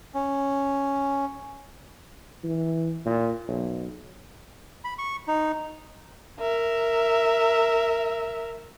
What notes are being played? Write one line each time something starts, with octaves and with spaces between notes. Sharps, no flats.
C#4
E3
A#2
B1
B5
C#6
D#4
A#4 E5